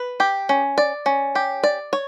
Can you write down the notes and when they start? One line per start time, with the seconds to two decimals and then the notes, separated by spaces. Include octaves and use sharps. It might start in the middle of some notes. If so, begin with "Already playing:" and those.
Already playing: B4
0.20 G4
0.49 C#4
0.78 D5
1.06 C#4
1.35 G4
1.64 D5
1.93 C#5